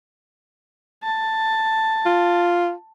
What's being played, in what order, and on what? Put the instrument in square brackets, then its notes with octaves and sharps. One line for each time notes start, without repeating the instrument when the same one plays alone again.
[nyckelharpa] A5
[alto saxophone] F4